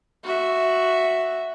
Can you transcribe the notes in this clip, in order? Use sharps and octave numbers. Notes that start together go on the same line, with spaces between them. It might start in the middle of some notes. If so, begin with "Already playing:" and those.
F#4 E5